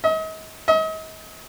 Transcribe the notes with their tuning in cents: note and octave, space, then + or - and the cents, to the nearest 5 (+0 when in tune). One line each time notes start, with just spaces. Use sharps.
D#5 +40
D#5 +40